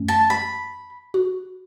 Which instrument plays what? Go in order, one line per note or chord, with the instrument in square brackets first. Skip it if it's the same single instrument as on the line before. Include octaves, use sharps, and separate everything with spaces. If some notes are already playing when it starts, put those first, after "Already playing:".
Already playing: [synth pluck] F#2 E3 A3 C#4
[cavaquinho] A5
B5
[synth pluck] F#4